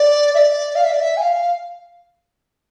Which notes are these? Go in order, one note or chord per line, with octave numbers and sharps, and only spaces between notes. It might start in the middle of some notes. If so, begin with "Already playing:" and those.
Already playing: D5
E5
D5
F5
E5
D5
E5
G#5
F5